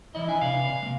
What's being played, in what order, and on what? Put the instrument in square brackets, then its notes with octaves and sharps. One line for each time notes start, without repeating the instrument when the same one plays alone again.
[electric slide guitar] E3 D5 D#5 [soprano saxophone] E4
[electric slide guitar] D4 E5 G#5
[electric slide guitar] C3 B4 D5 [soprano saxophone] F5
[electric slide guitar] C3
G#3 A#3